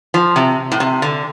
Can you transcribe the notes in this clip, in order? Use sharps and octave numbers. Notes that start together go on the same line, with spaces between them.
F3
C3
A2
C3
D3